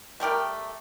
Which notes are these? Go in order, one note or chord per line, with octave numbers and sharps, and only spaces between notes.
G3 A3 G4 A#4